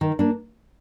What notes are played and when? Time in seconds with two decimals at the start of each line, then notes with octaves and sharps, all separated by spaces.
0.01 D#3
0.19 A#3 D4